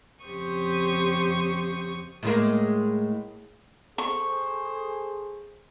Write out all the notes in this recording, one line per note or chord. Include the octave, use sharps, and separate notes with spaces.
F2 C#3 G4 C5 C#6 D#6
A2 G#3 A#3
G#4 A4 C5 C#6